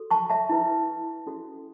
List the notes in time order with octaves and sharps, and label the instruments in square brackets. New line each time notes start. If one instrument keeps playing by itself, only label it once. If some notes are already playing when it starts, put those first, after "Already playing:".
Already playing: [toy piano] F#4 A4
A5 C#6
E5 A5
E4 B4
C#4 F#4 A4